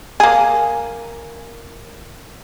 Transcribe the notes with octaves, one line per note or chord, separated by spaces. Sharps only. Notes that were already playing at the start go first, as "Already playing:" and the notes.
A#3 G#4